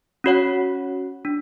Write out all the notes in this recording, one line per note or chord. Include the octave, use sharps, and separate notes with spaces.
C#4 F#4 C#5 F#5
D4